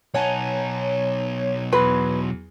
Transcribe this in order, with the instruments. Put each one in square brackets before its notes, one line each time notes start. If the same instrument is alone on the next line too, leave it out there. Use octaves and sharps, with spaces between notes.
[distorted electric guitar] B1 D#4 [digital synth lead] C#5 [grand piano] F#5 G#5 A5
[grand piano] E2 F#3 C6 [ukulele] B4